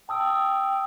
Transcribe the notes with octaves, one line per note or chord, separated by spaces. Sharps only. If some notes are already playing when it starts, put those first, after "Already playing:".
G5 A5 D#6 E6